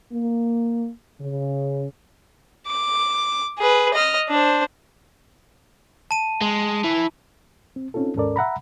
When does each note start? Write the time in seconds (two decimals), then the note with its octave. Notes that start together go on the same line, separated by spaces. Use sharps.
0.12 A#3
1.20 C#3
2.68 D6
3.59 G#4 B4
3.93 D#5 F6
4.29 D4 C5
6.11 A5 D#7
6.42 G#3
6.84 E3
7.76 C4
7.94 C4 C#4 D#4 F4 A4
8.15 D#2 G#2 C#4 A4 A#4 D5
8.36 E5 F#5 A#5 B5